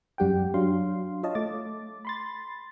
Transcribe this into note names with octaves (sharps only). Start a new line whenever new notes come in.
F#2 G3 G4 F#5 G5
F#3 D4 F5 C6
F4 C#5 D#5 F5 A5
A3 D6 A6
B5 C6 A6